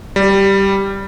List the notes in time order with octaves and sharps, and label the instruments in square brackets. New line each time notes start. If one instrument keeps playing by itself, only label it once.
[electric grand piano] G3